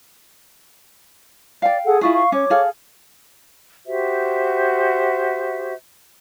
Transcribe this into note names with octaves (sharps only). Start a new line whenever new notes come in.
D5 F5 G5
G#4 A4 F#5
E4 F4 G#4 C#6
F5 C#6
C#4 C#5 D6
G#4 A4 F5
F#4 G4 C5 E5